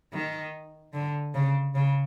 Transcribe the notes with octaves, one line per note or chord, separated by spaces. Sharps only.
D#3
D3
C#3
C#3